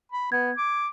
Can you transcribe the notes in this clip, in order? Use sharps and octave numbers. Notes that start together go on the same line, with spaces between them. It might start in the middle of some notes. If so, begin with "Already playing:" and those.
B5
B3 G#6
D6